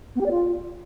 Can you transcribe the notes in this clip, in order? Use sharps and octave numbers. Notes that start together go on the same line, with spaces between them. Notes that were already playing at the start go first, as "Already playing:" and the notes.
B3
G4
D5
F4